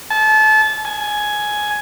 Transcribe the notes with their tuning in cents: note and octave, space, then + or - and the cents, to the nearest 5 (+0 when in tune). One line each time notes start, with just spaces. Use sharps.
A5 -30
G#5 +10